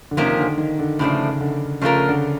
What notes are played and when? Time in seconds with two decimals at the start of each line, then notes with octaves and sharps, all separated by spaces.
0.11 D3
0.17 C3 D#3 F3 A#3 C#4
0.37 D3
0.58 D#3
0.79 D3
0.99 A2 C#3 F3 A3 D4
1.41 D3
1.81 C#3 F3 A3 D4 F4 A#4
2.09 D3